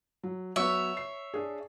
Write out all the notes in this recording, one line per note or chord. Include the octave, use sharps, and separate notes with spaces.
F#3
F#3 B3 C#5 E5
C7
D4 G#4